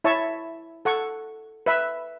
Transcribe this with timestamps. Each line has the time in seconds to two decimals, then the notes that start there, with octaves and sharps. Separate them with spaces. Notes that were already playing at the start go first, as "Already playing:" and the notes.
0.04 E4 C#5 E5 A5 C#6
0.85 A4 F#5 C#6
1.66 B4 E5 B5